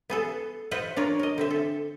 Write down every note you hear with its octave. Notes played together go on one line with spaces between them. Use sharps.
B3 G#4 A4
F4 B4 C5 D#5 E5 F#5
D4 F4 A#4 C#5
A#4 D#5
D3 C4 E5
A4